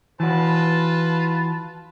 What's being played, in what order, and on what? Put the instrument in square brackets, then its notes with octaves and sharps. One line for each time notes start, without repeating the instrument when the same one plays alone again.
[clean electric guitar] E3 F#4 [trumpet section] F4 B4 A5